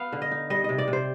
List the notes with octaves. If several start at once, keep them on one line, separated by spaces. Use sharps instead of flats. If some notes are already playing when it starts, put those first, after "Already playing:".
Already playing: B3 F5
D3
D#5
D#4
G3 D#5
C3 D#5
D5
C3
C5